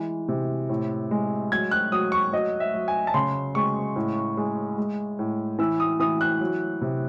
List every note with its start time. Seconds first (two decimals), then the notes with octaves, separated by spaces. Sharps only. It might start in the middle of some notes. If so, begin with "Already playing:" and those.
Already playing: E3 G#3
0.28 C3
0.69 A2
1.11 G#3
1.51 F#3 G#6
1.71 F#6
1.92 F#3 D#6
2.12 C#6
2.32 F#3 D#5
2.60 E5
2.74 F#3
2.88 G#5
3.07 A5
3.14 C#3 C6
3.55 G#3 C#6
3.96 A2
4.37 G#3
4.78 G#3
5.19 A2
5.59 E3 E6
5.80 D#6
6.00 E3 D#6
6.21 F#6
6.41 F#3
6.82 C3